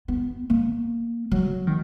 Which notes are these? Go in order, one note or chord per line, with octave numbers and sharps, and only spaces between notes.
B3
A#3
F#3
D#3